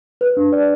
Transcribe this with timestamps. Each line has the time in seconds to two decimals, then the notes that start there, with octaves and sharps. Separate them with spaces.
0.21 B4
0.37 D4
0.52 D5